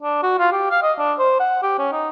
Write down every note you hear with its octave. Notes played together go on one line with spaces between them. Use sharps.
D4
F#4
F4
G4
F5
D#5
D4
C5
F#5
G4
C#4
D#4